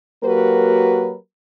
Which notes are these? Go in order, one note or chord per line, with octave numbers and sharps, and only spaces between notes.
F#3 A#3 F#4 G4 A#4 B4